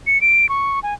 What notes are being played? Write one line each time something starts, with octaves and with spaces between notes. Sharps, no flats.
C#7
D7
C#6
G#5